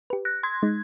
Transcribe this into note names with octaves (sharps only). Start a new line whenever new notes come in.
G4 B4
F#6 A#6
C6 G#6
G#3 D#4